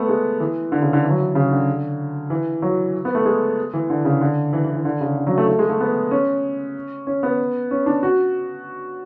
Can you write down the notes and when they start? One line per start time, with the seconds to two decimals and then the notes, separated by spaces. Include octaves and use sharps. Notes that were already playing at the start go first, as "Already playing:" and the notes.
Already playing: A3 B3
0.08 G#3
0.40 E3
0.72 D3
0.82 C#3
0.93 D3
1.04 E3
1.10 F#3
1.18 E3
1.35 C#3
1.51 D3
2.30 E3
2.62 F#3
3.05 B3
3.15 A3
3.25 G#3
3.73 E3
3.90 D3
4.05 C#3
4.21 D3
4.53 E3
4.64 E3
4.74 E3
4.85 D3
5.01 C#3
5.17 D3
5.27 F#3
5.38 A3
5.48 A3
5.59 G#3
5.69 A3
5.80 B3
6.11 C#4
7.07 C#4
7.23 B3
7.71 C#4
7.86 D4
8.03 F#4